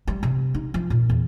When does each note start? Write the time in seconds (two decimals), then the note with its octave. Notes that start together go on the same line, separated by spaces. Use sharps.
0.07 G3
0.23 C3
0.54 D#4
0.74 F3
0.90 A#2
1.10 E2